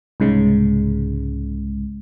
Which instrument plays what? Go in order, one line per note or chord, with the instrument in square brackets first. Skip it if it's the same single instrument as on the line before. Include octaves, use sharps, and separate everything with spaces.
[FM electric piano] C2 G#2 C#3 G#3